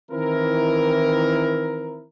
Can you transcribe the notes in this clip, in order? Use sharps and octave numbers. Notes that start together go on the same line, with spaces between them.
D#3 E3 C4 E4 A#4